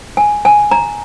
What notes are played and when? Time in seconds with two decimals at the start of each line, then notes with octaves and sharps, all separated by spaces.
0.17 G#5
0.45 G#5
0.71 A#5